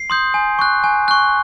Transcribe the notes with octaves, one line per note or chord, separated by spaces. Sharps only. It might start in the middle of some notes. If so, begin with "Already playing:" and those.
Already playing: C7
C6 D#6 G6
G#5
C#6 F#6
G#5
C#6 F#6